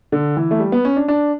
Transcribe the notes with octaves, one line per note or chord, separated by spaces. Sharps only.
D3
E3
A3
G3
B3
C#4
D4
D4